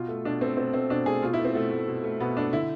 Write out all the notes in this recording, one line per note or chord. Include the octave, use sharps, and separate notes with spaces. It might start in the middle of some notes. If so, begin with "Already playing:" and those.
Already playing: B2 F4
A3
B2 D4
A3 C4
B2 C4
A3 C4
B2 D4
A3 G#4
B2 F4
E4
A3
C4
B2 A3
A3
B2
A3
B2 B3
A3 D4
D3 E4